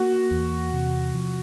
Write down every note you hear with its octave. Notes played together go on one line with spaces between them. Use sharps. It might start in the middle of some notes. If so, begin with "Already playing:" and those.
Already playing: A#3 F#4
E2
C3
F3